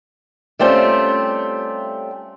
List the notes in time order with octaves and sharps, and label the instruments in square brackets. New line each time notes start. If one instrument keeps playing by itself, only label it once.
[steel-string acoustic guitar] G3 A3 C4 C#4 F4 G4